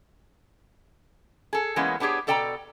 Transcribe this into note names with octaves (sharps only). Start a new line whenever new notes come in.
G#4 A4
E3 G#3 A#3 B3 C#4
B3 D4 G4 G#4 C#5
B2 A4 D5 G5 A5 A#5